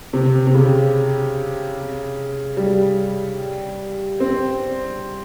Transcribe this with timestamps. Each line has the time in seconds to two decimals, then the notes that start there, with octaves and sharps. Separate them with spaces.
0.13 C3
0.47 C3
0.55 C#3
2.57 G3
4.20 C4